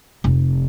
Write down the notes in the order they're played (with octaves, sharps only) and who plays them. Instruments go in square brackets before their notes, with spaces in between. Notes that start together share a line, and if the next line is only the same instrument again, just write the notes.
[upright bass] F1